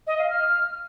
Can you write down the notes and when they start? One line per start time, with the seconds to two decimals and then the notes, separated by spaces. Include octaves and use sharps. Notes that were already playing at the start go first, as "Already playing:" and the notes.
0.07 D#5
0.19 F5
0.30 F6